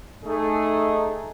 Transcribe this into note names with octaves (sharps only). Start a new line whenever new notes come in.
A3 D#4 G#4